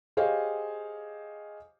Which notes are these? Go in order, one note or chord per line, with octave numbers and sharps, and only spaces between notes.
G4 G#4 C5 C#5 D#5 F5